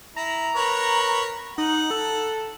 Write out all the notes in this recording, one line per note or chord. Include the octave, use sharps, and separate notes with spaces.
E4 A#5
A#4 B4 C#5
D#4 F#5
A4